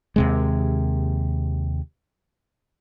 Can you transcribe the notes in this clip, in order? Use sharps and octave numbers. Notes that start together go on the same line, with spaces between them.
D#2 C3 G#3